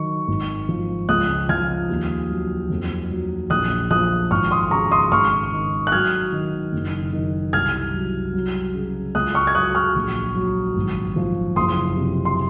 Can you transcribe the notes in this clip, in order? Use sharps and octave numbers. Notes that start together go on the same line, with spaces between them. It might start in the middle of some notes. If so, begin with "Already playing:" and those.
Already playing: D#3 F#3 C#6
G#1
F3
C#2 D#6 F#6
F3 F6 G#6
D#2
F#3
F2
F#3
A#1 D#6 F#6
F3 D#6 F#6
G#1 C#6 F6
C6 D#6
C#3 A#5 C#6
C6 D#6
G#1 C#6 F6
D#3
F#6
F#3 F6 G#6
D#3
F#1
D#3
C2 F6 G#6
F#3
F#3
C#3
C#2 D#6 F#6
C#6 F6
G#6
F#3 D#6 F#6
C#6 F6
A#1
F#3
G#1
F3
F#1 C6 D#6
C3
C6